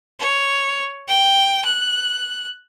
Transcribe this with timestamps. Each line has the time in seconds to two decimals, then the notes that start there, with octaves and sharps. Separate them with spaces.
0.20 C#5
1.08 G5
1.65 F#6